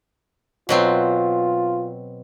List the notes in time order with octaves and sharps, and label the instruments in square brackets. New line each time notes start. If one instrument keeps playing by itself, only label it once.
[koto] B2 F#3 C4 [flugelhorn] F4